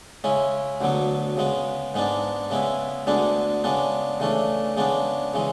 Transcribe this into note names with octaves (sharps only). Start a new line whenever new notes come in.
C#3 G#3 C#4 E4
D2 D3 F#3 B3
C#3 G#3 B3
G#2 G#3 B3 D4
C#3 G#3 B3 E4
D2 D3 G#3 B3 D4
C#3 G#3 B3 D4
C#3 E3 A3 D4
C#3 G#3 B3 D4
C#3 E3 G#3